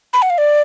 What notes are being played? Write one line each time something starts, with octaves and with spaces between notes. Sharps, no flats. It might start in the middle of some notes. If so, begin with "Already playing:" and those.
B5
F#5
F5
D5